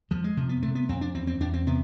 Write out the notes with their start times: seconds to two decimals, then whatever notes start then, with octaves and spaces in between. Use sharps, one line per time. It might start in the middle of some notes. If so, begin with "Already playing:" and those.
0.11 F2 F3
0.24 G#3
0.37 C3 F3
0.49 B3
0.62 C3 A3
0.75 B3
0.89 F2 C4
1.01 D4
1.15 E2 C4
1.27 C4
1.40 E2 D4
1.54 C4
1.66 C3 B3